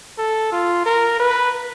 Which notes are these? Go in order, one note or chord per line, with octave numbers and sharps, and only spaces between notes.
A4
F4
A#4
B4